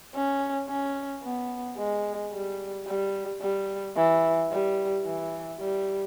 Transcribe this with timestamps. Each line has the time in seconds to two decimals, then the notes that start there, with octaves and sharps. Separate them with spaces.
0.14 C#4
0.68 C#4
1.23 B3
1.78 G#3
2.33 G3
2.87 G3
3.41 G3
3.96 E3
4.51 G3
5.06 E3
5.59 G3